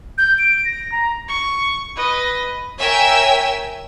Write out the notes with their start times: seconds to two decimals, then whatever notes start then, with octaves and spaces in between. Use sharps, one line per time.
0.18 G6
0.38 D7
0.65 A#6
0.92 A#5
1.28 C#6
1.96 B4 D#5
2.79 A#4 C#5 E5 G5 G#5 E6